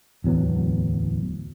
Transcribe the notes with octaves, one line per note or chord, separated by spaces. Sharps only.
D1 E2 F#3 B3